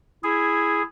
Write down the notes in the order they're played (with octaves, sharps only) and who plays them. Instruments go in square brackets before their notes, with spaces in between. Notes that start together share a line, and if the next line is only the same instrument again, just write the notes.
[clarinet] E4 [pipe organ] G#4